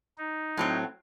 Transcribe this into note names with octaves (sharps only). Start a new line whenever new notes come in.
D#4
A2 F#3 C4